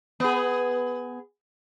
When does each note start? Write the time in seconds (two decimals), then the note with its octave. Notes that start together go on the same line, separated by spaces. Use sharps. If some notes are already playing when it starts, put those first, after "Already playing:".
0.20 B3 G#4